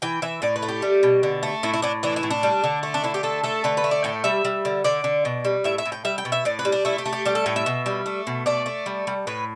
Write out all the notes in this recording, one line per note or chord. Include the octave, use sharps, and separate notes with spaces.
E3 G5
E3 E5
A2 D5
B4
A3
G4
G3
B2
D3
A3
A2 E4
E4
A2 D4
E3 D4
E4
A2
D4
G3
D3
A3
D4
D3 E4
G4
A3 A4
A3 A4
D3 B4
B4
A3
D5
A2 G5
G3 E5
G3
D3
D3 D5
D3
B2
G3
A2 E5
E5
A2
G5
G3 E5
G5
B2
E5
A2 D5
B4
G3
D4
A3 E4
G4
A3
G4
G3 G4
A4
A2 G5
E5
B2
G3
A3
B2
A3 D5
A3
G3
G3
A2 B4